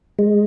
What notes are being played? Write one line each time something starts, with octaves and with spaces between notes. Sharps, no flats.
G#3